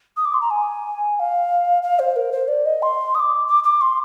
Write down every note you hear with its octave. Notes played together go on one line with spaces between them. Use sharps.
D#6
D6
C6
A#5
G#5
G#5
F5
F5
C5
A#4
C5
D5
D#5
C6
D#6
D6
D6
D6
C6